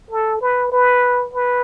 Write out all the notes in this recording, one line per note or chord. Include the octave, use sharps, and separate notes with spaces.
A4
B4
B4
B4